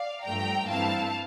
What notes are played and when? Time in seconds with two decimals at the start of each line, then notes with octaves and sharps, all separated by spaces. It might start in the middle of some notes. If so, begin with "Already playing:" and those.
Already playing: D5 F5
0.25 G2 F3 A3 G5 A#5
0.69 G2 E3 A3 C4 E4 F5 A5